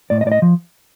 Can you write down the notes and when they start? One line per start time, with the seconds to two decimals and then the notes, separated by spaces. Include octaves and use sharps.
0.10 A2 D5
0.21 D#5
0.26 A2 D5
0.32 D#5
0.42 F3